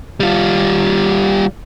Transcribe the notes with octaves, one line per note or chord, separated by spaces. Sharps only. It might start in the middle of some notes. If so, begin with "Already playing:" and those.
G3 F4